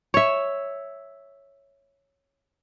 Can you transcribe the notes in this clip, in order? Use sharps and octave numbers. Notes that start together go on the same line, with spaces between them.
C#5 E5